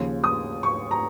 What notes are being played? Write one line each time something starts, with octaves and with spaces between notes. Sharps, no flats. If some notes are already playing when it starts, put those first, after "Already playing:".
Already playing: D#2 C#3 F3
D#6
C#6
A#5